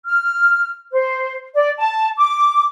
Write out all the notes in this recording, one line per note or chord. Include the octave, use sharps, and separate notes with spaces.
F6
C5
D5
A5
D6